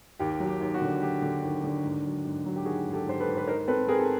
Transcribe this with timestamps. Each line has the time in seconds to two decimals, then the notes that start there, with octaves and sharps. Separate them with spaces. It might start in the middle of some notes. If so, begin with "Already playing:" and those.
0.19 D#2 G4
0.40 F#3
0.47 G4
0.61 D#2
0.74 F#4
0.82 D3
1.02 F#3 G4
1.22 D3
1.43 D#2
1.64 D3
1.84 G#2
2.05 F#3
2.25 G#2
2.45 F#3
2.56 G4
2.65 D#3 F#4 G#4
2.86 G#2
2.93 G4 A4
3.06 G#2 C5
3.20 A4 B4
3.27 G#2
3.37 B4
3.47 D#4 A#4 C5
3.68 C4 A4 B4
3.88 C4 G#4 A#4
3.99 A4